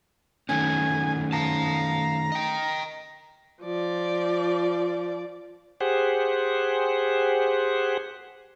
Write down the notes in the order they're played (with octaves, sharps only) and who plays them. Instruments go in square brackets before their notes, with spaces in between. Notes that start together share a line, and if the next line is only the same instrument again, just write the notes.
[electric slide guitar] D#3 A3 C#4 [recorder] G#5
[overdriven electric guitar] F5 A5 [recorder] A#5
[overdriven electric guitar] D#5 G5
[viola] F3 D5
[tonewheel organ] G4 G#4 C5 F#5